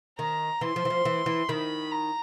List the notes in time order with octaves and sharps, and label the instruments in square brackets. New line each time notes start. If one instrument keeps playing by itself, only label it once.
[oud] D#3 [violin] A#5
[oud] E3 [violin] C6
[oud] F3
E3
F3
E3
E3
[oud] D#3 [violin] B5
[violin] A#5